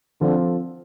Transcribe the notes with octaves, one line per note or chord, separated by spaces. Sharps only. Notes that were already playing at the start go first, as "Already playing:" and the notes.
D3 F3 C4 F4 A4